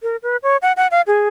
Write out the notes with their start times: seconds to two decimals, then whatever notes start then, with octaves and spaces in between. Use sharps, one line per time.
0.03 A#4
0.23 B4
0.43 C#5
0.62 F#5
0.77 F#5
0.91 F5
1.07 G#4